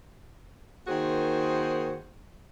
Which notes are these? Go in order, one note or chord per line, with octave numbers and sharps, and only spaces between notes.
D#3 A#3 F#4 G#4 C5